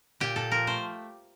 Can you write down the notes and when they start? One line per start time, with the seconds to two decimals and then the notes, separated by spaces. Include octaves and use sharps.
0.20 A#2 G4
0.36 A#2 A4
0.52 F3 A#4
0.67 A3 C5